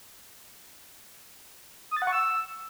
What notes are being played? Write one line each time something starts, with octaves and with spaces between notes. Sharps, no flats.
D#6
A6
F#5
C#6
E6